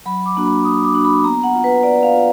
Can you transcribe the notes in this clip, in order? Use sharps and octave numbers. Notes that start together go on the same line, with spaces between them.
F#3 B5
D6
A#3 D4 F#4
B5
F#3 D#6
D6
A#3 D4 F#4
B5
B3 A#5
F#5
F4
B4
B3 D5
F5
F4